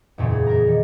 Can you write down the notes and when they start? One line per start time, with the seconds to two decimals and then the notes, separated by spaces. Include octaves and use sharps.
0.18 F#1 E2 A#2 C#3
0.30 G#4
0.47 E2 A#4 A#5
0.67 D#3 G3